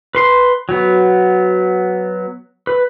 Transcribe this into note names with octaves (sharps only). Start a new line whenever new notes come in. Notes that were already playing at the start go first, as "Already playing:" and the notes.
B4 C6
F#3 B3
B4